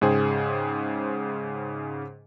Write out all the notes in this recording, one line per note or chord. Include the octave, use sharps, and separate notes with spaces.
G#2 C#3 G#4 C5 G5